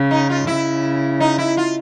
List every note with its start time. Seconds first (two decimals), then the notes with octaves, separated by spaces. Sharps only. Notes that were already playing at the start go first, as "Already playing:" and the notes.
Already playing: C#3
0.11 D#4
0.30 F4
0.47 C#3 E4
1.20 D#4
1.38 E4
1.57 F4